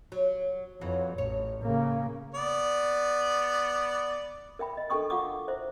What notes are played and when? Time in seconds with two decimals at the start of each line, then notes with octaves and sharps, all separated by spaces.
0.12 F#3
0.81 F2 E3 F#3 F#4
1.18 A1 C#5
1.63 C#3 A#3
2.35 B3 D5
4.59 A#4 E5 G5 B5
4.77 D#5
4.90 D4 A4 A#4 G5 C#6 D#6
5.10 F4 F5 F#5 D6 D#6
5.48 E4 C5 E5